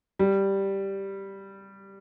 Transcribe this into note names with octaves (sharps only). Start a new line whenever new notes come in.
G3